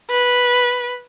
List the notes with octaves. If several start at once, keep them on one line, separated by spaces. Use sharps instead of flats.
B4